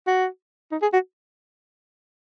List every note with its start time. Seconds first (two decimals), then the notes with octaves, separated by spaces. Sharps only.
0.07 F#4
0.72 D#4
0.82 G#4
0.93 F#4